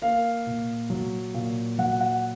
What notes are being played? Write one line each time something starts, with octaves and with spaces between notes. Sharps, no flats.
A#3 F5
A#2
F#3
A#2
F#3 F#5
F#5